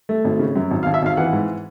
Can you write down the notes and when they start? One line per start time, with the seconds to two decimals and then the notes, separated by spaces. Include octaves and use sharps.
0.09 A3
0.24 G#1
0.39 C#3
0.55 F#2
0.71 G#1
0.83 F5
0.86 G#1
0.94 E5
1.02 G#1 F5
1.17 E3 F#5
1.33 G#2